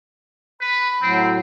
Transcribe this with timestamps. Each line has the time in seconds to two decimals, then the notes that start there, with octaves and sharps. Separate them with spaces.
0.61 B4 B5
1.02 A2 F#3 C4